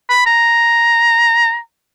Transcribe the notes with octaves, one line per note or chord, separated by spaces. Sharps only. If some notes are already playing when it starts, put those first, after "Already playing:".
B5
A#5